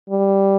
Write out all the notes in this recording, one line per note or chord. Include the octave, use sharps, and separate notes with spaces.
G3